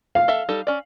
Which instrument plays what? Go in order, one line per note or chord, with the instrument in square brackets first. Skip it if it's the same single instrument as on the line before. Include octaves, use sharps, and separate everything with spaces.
[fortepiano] F5
[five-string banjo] A4 E5
G3 D#4 A4
C#4 D5